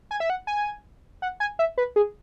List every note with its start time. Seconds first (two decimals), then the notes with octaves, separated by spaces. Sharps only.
0.11 G#5
0.20 E5
0.30 F#5
0.47 G#5
1.22 F#5
1.40 G#5
1.59 E5
1.78 B4
1.96 G#4